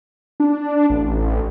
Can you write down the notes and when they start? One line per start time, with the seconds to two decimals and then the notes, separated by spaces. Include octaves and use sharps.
0.40 D4
0.90 A1